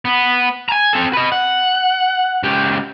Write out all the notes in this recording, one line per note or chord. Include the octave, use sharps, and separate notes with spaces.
B3
G#5 A#5
C4 A4
B4 D#5
F#5
C#2 G4